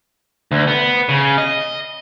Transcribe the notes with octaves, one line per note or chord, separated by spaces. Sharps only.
D2
B3
C#3
D#5